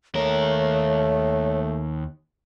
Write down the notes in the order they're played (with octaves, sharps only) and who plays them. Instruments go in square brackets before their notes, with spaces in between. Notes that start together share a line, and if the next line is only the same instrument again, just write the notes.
[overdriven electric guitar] D#2 A#4 [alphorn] A3 [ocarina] C#5